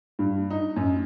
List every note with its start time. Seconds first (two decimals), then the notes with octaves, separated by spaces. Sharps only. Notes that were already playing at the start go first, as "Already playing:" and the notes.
0.19 G2
0.50 D#4
0.76 F#2